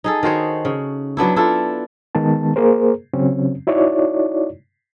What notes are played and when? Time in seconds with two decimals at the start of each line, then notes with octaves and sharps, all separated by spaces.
0.04 D#4 G#4 A4
0.23 D#3 F#4 C5 C#5
0.65 C#3
1.17 F#3 B3 D4 E4
1.36 D4 E4 F4 A4
2.15 D#3 G#3 B3 A5
2.56 A#3 G#4 A#4 C5
3.14 C#3 F#3 C4 C#4
3.67 D#4 E4 F#4 C#5 D5